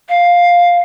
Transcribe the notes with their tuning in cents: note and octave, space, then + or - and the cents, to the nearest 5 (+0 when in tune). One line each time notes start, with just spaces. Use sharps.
F5 +5